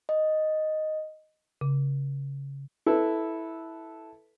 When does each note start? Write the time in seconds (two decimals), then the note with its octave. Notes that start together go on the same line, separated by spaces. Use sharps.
0.09 D#5
1.61 C#3
2.86 E4 A4 B4